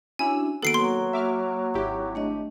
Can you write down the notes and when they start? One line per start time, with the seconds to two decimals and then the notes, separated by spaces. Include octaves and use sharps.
0.19 C#4 D4 E4 F#4 G#5 E6
0.63 D#3 A#3 B3 F#4 A4 C7 D7
0.74 F#3 C6
1.13 E5 D6 F6
1.74 G#1 E4 G4 D6
2.15 A3 D4 D#5